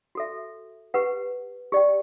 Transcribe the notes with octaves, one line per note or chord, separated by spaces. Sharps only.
F#4 A4 E5
G4 B4 F#5
G4 D5 G5